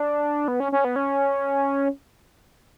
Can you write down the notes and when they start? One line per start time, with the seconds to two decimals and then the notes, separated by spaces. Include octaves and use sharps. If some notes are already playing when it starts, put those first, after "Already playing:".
Already playing: D4
0.48 B3
0.60 C#4
0.72 C#4
0.84 B3
0.96 C#4